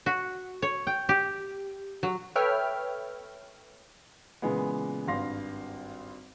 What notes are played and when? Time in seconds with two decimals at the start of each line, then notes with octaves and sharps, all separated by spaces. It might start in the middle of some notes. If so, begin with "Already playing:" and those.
0.06 F#4
0.62 C#5
0.87 G5
1.09 G4
2.03 F#3
2.35 A4 B4 C#5 E5 G5 F6
4.42 A#2 C#3 E3 G#3 B3
5.08 G#1 G2 F5 C6 A#6